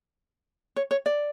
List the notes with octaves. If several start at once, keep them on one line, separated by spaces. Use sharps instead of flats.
C#5
C#5
D5